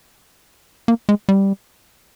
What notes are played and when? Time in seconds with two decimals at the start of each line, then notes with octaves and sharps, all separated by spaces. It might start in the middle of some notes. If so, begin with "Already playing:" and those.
0.88 A#3
1.09 G#3
1.29 G3